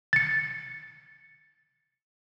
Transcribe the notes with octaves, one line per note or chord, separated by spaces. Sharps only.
A6 C#7